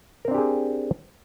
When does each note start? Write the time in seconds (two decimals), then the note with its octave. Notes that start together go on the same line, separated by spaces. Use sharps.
0.25 A#4
0.28 C4
0.31 D4
0.34 G4
0.38 G#4